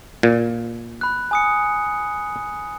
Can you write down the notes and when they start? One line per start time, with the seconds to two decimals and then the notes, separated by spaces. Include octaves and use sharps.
0.23 A#2
1.01 B5 F#6
1.31 G#5 D#6 C#7